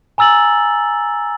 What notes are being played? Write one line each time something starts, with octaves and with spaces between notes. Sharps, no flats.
G#5 A#5 E6 A6 F#7